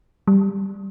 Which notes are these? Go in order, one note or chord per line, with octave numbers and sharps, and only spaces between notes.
G3